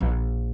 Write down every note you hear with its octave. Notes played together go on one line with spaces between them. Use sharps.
A#1